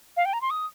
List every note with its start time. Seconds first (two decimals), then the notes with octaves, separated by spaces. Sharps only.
0.17 F5
0.25 G5
0.33 A#5
0.41 C6
0.50 D#6